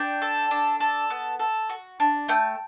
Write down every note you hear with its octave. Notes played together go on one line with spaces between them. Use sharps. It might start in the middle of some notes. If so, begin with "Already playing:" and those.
Already playing: D4 G5
A4
D4
A4
B3
A4
F#4
D4
A3 G5